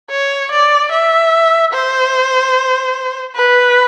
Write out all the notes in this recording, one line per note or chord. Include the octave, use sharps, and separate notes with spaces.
C#5
D5
E5
C5
B4